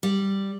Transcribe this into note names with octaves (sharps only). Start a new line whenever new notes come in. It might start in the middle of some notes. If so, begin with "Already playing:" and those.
G3